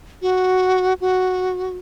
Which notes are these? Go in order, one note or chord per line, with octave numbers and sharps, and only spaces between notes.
F#4
F#4